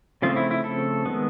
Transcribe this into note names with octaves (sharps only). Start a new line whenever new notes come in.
C#3 F3 A3 C4 F4
E4
E4
A4
D#3 G#3 B3